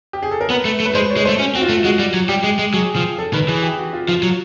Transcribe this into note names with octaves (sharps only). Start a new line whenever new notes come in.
G4
G#4
A4
A#4
B3 B4
A3
A3
B4
G#3 C5
C#5
G#3
C5
A3
C#4
C4 F#4
F4
A3
G#3 F#4
G3
F#3
G3 G4
G#3
G#3
F#3 G#4
F3
A4
D#3 B4
E3 G#4
G4
F#4
F4
F3 F4
F#3